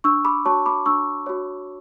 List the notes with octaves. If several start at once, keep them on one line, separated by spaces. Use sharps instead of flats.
D4 C#6 E6
B5 D6
F#4 C#5 A5 C#6
B5 D6
D4 C#6 E6
F#4 C#5